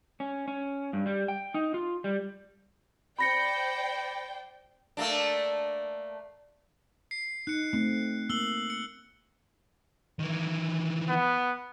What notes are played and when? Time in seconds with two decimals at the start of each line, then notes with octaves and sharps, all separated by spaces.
0.20 C#4
0.48 C#4
0.93 G2
1.06 G3
1.28 G5
1.54 D#4
1.74 F4
2.04 G3
3.19 C5 D5 G5 B5 A#6 C#7
4.97 A3 A#3 D4
7.11 C7
7.47 D#4 F#6 C#7
7.73 A3 C4
8.30 A#3 E6 F#7
8.70 C#7
10.19 D#3 E3
11.09 B3